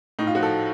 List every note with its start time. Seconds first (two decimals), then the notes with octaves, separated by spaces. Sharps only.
0.19 A2 D#4
0.27 F4
0.35 F3 F#4
0.43 A4